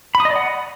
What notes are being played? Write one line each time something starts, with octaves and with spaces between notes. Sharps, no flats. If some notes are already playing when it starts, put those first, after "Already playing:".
B5
D#6
D#5
D5
F#5